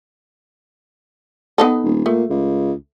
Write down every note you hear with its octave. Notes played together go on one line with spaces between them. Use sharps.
B3 D#4 A4
D#1
A#2 A3
C#2